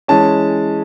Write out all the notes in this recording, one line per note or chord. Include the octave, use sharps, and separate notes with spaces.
E3 G#3 C#4 A5